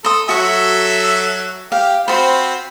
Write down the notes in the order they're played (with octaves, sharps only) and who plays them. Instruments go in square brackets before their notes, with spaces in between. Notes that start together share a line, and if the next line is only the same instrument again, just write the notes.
[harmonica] A4 [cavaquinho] C6 D#6
[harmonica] F#3 A4 E5 [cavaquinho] F#4 C#6
[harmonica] G4 [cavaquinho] F5
[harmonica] C4 F4 B5 [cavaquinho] F#4 C5